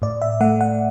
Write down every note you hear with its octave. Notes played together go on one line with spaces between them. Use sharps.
A2 D5
E5
A3 F#5
F#5